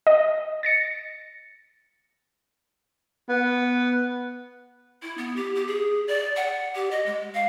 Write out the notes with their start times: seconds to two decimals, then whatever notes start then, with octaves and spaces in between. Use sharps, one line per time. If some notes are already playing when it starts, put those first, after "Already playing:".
0.07 D#5
0.63 A6 A#6 C#7
3.29 B3
5.02 E4
5.17 B3
5.36 G4
5.55 G4
5.68 G#4
6.08 D5
6.36 F#5
6.75 G4
6.91 D#5
7.06 G#3
7.35 F5